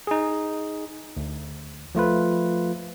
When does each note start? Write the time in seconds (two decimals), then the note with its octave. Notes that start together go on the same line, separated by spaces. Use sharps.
0.07 D#4 G#4
1.17 D2
1.95 F3 A3 F4 B4